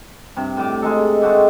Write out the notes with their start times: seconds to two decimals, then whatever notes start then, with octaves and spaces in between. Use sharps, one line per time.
0.36 G2 C3
0.57 A2 D6
0.82 G#3 D#4 A4
1.22 G#3 A3 F#4 G4